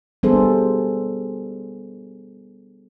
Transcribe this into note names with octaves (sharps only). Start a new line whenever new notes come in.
G3 B3 D4 G#4 A4 C5